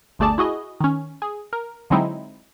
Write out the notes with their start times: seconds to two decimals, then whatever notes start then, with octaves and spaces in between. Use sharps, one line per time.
0.19 G1 D2 A3 G#4 D5 A5
0.38 E4 F#4 G#4 D#5
0.80 D#3 C#4
1.22 G#4
1.53 A#4
1.90 D3 F#3 G#3 C4 D#4 E4